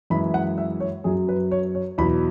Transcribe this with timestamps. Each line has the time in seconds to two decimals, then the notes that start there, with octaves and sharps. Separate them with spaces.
0.10 F#2 E3 G#3 B5
0.34 F#5
0.58 E5
0.80 C#5
1.04 F#2 F#3 G#4
1.29 B4
1.51 C#5
1.75 C#5
1.98 E2 B2 F#3 B5